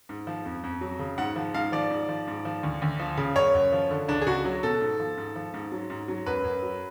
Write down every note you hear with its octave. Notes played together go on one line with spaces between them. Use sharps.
G#2
F3
F2
F2
F#3
C#3
G#2 F#5
F3
G#2 F5
F3 D5
G#2
F3
G#2
F3
D2
D2
F3
C#3
F#2 C#5
F#2
F3
D3
C#2 D4
G#4
C#2 F#4
F#3
B2 A4
G#2
F3
G#2
F3
G#2
F#3
G#2
F#3
F#2 B4
F#2
F#3